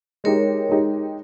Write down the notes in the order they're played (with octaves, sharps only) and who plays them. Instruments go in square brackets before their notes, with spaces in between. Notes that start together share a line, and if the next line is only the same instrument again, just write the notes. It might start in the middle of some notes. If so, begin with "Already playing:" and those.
[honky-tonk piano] G#3 D#4 G4 [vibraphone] A#4 C#5
[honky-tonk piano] G#3 D#4 G4